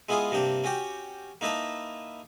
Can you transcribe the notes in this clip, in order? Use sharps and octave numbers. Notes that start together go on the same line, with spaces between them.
G#3 B3 E4 F4 G#4
G2 C3 A#3 D4 G5
C#4 F#4 G4 G5
A#3 D#4 E4 B4 A5